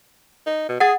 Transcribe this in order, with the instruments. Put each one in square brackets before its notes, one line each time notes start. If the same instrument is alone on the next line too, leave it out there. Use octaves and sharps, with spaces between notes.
[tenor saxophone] D#4
B2
[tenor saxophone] G#4 [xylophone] F#5 D#6 A6